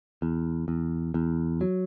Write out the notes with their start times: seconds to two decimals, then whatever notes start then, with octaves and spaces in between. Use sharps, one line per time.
0.22 E2
0.68 E2
1.14 E2
1.61 F#3